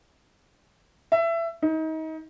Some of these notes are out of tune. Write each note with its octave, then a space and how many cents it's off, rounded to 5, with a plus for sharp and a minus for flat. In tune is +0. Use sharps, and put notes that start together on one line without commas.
E5 +20
D#4 +30